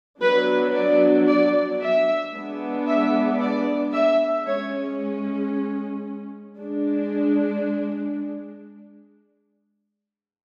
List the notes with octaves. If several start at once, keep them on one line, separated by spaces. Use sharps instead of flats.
F#3 B3 D4 B4
D5
D5
E5
G#3 B3 D4
E5
D5
E5
G#3 C#4 C#5
G#3 D4